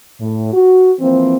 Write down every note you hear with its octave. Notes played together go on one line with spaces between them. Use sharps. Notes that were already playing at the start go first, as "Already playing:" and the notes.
A2
F#4
E3 F3 A#3 C4